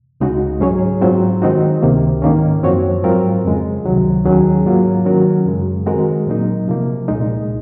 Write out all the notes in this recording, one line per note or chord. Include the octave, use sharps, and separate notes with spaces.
C#2 C#3 G#3 D#4 F#4
G#2 F#3 C#4 G#4 C#5
G#2 F#3 C4 F4 C5
D#3 G#3 C4 D#4 F#4
C#2 C3 D#3 A#3
G#2 D#3 A#3 C#4
F#2 F3 C4 F#4 C#5
G#2 F#3 C4 F4 A#4
F2 C#3 G#3
C#2 C3 D#3 F#3
D#2 D#3 F#3 C#4 G#4
G#2 F#3 A#3 F4
D#3 F#3 C#4 F#4 A#4
F#2 C#3 G#3
D#3 G#3 C4 F#4 A#4
A#2 F#3 A#3 D#4
C3 F3 A#3
C2 A#2 G#3 D#4